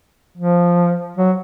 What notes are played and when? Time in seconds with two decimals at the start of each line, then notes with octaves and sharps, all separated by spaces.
0.37 F3
1.17 F#3